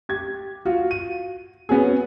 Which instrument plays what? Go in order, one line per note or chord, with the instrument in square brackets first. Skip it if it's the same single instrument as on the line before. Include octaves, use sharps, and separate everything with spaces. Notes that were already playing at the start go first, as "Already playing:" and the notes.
[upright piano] G4 G#6
F4 F#4
D#7
B3 C#4 F#4 G#4